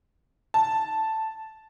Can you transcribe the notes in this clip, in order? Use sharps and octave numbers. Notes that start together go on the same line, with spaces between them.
A5